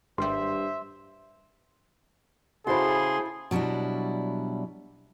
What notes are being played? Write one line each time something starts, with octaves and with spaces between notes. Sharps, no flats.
G#1 G2 G3 C5 E5 C6
C#3 E4 F#4 G#4 A4 C5 C6
B2 F#3 G3 D4 E4